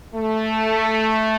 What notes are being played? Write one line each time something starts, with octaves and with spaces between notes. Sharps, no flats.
A3